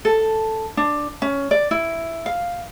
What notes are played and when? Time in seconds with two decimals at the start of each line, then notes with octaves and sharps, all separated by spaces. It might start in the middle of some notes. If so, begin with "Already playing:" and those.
0.05 A4
0.77 D4
1.22 C#4
1.51 D5
1.71 E4
2.26 F5